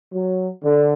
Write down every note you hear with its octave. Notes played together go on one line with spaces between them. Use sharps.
F#3
D3